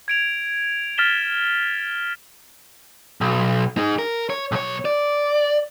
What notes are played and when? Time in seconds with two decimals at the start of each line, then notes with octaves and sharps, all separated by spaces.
0.08 G#6 D7 F7
0.98 F6 A6 B6 E7 G7
3.21 B1
3.78 D#4 G#4
3.99 A#4
4.30 C#5
4.52 B1 C#5
4.85 D5